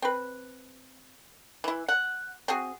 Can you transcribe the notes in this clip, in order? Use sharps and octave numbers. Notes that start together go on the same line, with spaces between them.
C4 B4
E3 E4
F#5
C4 F#4 G#4